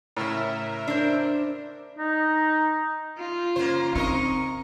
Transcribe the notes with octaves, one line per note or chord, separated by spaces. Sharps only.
A2 C#3 A#4 E5
D4 C5
D#4
F4
C#3 A#3 C5
C4 D#4 A#4 D#5 C#6